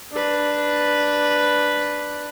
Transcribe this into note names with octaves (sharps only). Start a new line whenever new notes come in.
D4 B4